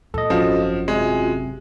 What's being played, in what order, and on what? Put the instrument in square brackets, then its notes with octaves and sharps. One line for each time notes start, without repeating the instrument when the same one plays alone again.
[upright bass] A#2 [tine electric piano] A4 D#5
[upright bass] G#1 F#2 [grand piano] F3 [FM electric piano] C#4 F4 F#4
[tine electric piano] C3 [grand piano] G#3